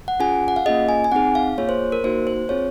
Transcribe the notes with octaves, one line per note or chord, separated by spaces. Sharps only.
F#5
C#4 F4 G#4 G#5
F#5
F5
A#3 C#4 F4 G#4 D#5
G#5
G#5
C4 D#4 G#4 F#5
F5
A#3 F4 G#4 C#5
C5
A#4
A#3 D#4 F#4 C5
C5
C4 F4 G#4 C#5